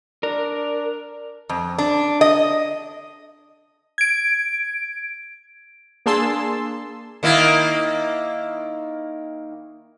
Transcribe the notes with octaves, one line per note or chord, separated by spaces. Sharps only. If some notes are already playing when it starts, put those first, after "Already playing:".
D4 A#4
F2
D4
D#5
G#6 D7
A#3 D4 G#4 A5 C6 E6
D#3 A#3 E4